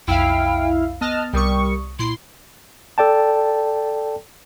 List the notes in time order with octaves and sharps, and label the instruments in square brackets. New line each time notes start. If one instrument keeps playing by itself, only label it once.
[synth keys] B1 F2 E6 [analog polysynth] E4 F5 [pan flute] G5
[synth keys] B3 [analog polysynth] D#5 A5 F6 [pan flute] F#6
[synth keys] C2 D#6 [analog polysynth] G3 C#6 [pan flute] A#4
[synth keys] A#2 [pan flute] E4 [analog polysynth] C6
[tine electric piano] A4 D5 G5 A5